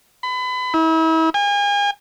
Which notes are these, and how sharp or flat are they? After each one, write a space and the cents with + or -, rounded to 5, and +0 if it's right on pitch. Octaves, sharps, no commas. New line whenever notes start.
B5 +30
E4 -35
G#5 -40